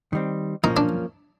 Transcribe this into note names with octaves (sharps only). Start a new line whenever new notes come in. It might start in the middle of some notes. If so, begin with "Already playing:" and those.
D#3 G3 C4
F3 A#3 C#4 D#4
D4